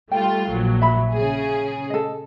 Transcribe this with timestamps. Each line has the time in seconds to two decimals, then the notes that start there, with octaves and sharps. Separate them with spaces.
0.12 G3 A3 F4 G5
0.49 A#1 F#3
0.82 E5 B5
1.11 C#3 G#4
1.90 A4 D#5